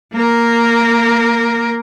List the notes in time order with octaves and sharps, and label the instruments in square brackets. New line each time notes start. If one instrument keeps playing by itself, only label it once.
[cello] A#3 A#4